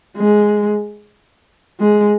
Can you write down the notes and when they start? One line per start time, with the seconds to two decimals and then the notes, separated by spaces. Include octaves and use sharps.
0.17 G#3
1.80 G#3